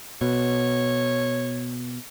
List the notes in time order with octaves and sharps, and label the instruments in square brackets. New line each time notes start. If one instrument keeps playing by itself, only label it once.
[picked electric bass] B2 [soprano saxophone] C#5